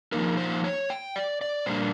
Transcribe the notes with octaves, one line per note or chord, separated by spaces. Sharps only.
F3 A#3 D#4 A#4
C5
C#5
G5
D5
D5
A#2 G3 A#3 D4 C5